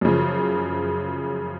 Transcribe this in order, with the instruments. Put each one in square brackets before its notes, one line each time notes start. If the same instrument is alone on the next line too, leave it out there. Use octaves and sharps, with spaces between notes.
[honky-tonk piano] F#2 C#3 F3